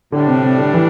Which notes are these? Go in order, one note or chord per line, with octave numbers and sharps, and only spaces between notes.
A2 D3 G3 D4
C3
C3
D3
E3